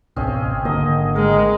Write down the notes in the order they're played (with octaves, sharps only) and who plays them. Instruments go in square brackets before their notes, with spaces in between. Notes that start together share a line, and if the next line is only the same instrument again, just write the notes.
[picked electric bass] G#1 C#2 B2 [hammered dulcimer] C4 C#4 G#4
[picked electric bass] G#1 D3 A#3 [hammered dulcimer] D#5
[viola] G#3 [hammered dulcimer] A#4